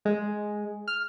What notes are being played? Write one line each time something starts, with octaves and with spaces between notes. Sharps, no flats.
G#3
F6